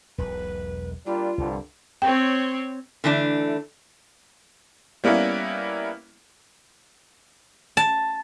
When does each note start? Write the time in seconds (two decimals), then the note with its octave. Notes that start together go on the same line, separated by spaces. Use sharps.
0.18 E1 B1 G#2 B4
1.06 G3 A#3 D4 F4
1.38 C2 G2 D3 F3
2.02 C4 C#5 G5
3.04 D3 E3 A3 D4
5.04 G3 A#3 B3 C#4 E4
7.77 A5